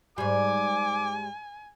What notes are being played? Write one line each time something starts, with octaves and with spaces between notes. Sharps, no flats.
G#2 G3 G#5 D6